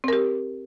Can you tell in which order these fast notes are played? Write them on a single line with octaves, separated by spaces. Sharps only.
C4 A#4 G4